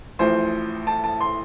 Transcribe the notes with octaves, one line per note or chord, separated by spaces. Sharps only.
A1 A2 F3 C5
A5
A5
C6